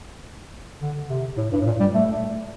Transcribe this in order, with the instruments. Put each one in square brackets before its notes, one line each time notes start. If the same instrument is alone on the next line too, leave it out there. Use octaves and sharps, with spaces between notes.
[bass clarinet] D3
C3
A2
G2
A2
A#2
G3
A3